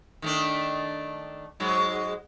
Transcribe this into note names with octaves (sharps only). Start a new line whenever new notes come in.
D#3 A3 D4
G#2 F#3 G#3